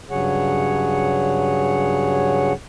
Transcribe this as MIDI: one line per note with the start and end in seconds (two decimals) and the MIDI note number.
0.10 2.53 43
0.10 2.53 49
0.10 2.53 54
0.10 2.53 68
0.10 2.53 73
0.10 2.53 78